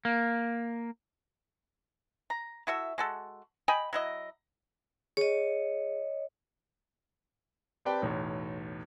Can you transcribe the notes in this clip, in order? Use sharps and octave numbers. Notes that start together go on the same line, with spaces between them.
A#3
A#5
E4 F#4 A4 E5
G#3 F#4 A4
D#5 G5 G#5 B5
F#3 E4 D#5
G#4 C#5 D#5
C4 G4 B4 D5 G5 A5
B1 E2 A2